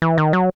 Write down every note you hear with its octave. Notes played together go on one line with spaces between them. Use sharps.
E3
D#3
F#3